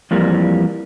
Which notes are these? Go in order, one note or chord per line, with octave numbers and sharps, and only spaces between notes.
F2 E3 G3 A#3